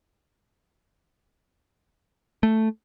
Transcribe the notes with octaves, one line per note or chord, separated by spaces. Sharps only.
A3